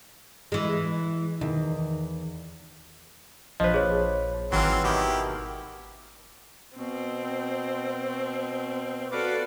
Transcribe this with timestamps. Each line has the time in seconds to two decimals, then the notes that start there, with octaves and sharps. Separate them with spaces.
0.52 E3 G#3
1.41 E2 D#3
3.60 A#1 F3 B4 C5 D#5
3.74 G#4 C#5
4.52 G#1 E3 F#3 C4 F6
4.84 B2 D#3 E4 G4
6.77 B2 C4
9.12 F#4 A4 B4 D5 F5 D6